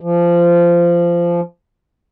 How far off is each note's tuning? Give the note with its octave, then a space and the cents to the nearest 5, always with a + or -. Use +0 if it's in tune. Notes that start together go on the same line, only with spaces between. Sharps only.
F3 -20